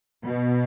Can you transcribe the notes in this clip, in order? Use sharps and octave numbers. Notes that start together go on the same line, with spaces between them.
B2